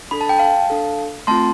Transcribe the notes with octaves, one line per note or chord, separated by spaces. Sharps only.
D4 A4 B5
A5
G5
F5 A5
D4 A4
A3 C4 F4 A5 C6